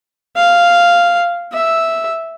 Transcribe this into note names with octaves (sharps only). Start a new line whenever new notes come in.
F5
E5